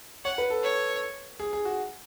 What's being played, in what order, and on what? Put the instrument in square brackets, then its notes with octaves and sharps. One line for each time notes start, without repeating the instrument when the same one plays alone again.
[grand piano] C#5 [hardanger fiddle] F#5
[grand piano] B4
A4
[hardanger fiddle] C#5
[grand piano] G#4
G#4
F#4